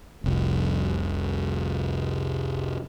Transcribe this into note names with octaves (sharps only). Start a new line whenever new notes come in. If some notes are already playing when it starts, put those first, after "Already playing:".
F1 C2